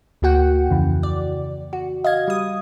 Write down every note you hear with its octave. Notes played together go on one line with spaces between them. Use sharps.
D2 A#3 F#4 F#5 G5
F2 C#3 E3
D5
F#4
D#5 F5 G#6
G3 D#6